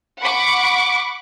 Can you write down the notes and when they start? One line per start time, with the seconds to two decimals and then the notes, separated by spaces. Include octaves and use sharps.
0.21 F#5 B5 C#6 D6